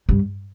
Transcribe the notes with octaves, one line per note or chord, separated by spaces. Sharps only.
G2